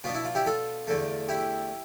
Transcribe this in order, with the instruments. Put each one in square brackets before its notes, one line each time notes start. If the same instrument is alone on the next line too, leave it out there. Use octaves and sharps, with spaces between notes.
[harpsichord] B2 B3 D4 F4
E4
F4
E4 G4
F4 A4
E2 D3 A3
E4 G4